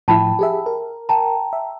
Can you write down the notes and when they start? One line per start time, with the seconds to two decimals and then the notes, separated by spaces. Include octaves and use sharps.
0.08 A2 F3 E4 G5 A5 B5
0.39 G4 G#4 E5
0.66 A#4
1.09 G5 A5 A#5
1.53 E5